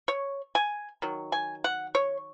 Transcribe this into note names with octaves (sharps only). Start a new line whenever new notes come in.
C#5
G#5
D#3 F#3
G#5
F#5
C#5